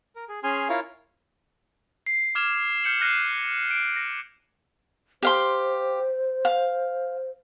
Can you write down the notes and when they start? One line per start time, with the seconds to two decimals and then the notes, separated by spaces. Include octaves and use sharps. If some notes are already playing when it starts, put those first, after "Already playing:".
0.16 A#4
0.29 G#4
0.44 C#4 G#4 G#5 C6 F6
0.69 E4 F4 A#4 C#5 F5
2.07 C7
2.35 D6 F6 G#6 E7 F7
2.84 F6 G6 C#7 F#7
3.01 F6 F#6 A#6 C7 D#7 E7
3.71 D7
3.96 A#6
5.23 G4 C5 F5 C6
6.45 F5